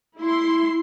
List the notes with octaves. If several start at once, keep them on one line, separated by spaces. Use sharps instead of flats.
E4 C6